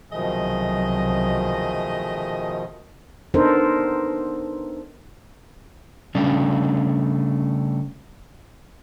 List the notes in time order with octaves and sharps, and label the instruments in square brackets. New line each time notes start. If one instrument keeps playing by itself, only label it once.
[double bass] C2 F#3 [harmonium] B2 D#3 F3 [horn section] A3 G#4 D#5
[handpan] B3 D4 D#4 A4 A#4 C5
[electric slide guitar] C#3 G3 A3 C#4 D4